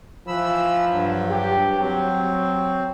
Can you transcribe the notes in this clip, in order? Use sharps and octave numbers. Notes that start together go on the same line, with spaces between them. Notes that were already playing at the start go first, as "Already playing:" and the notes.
E3 F3 B5 E6
G2 F#3
G4
F#3 C4